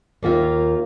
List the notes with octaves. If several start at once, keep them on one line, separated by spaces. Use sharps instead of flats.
D#2 A#3 F4 E5